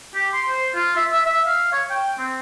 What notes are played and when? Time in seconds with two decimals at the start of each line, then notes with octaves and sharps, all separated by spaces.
0.14 G4
0.33 C6
0.48 C5
0.75 F4
0.96 E5
1.13 E5
1.26 E5
1.46 F5
1.72 C#5
1.90 G5
2.18 C4